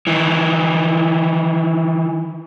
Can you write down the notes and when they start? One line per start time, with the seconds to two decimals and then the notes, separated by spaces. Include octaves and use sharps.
0.07 D#3 E3